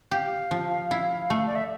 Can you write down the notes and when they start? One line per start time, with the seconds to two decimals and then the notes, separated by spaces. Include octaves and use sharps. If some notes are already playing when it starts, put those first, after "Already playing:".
0.11 G4 F5
0.51 F3
0.91 E4
1.30 A3
1.47 D5
1.55 E5